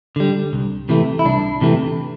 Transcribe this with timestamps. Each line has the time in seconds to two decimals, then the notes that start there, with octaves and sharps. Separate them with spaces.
0.16 D3 G3
0.53 C2
0.89 C3 E3 A3
1.19 E4
1.25 C2 D4
1.61 C3 E3 A3